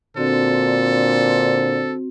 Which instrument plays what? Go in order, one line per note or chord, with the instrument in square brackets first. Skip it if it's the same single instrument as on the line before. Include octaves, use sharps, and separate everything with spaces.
[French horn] A#2 [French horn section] D3 D4 C5 [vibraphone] C4 F#4 [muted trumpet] A4